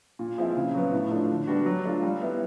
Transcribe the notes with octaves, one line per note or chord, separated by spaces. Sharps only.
A#2
F3 G#3 C4 E4
C#3
F#3 B3
A2
F3 A3 D4
D3
G3 B3 D4 F#4
F#3
A3 D4 F4
G3
B3 E4